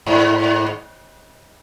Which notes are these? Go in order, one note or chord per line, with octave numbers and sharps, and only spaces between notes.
G#2